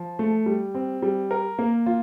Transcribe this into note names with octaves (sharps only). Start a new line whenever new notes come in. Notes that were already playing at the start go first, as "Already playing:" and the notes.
Already playing: F3
A3
G3
C4
G3
A#4
A#3
F4